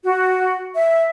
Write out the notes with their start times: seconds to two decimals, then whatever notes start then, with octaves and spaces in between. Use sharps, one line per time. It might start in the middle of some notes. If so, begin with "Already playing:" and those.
0.04 F#4
0.74 E5